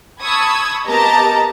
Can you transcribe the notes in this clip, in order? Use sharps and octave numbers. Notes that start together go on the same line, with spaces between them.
A5 B5 C#6 D#6 E6 G#6
B3 G4 A#4 D#5 A5 A#5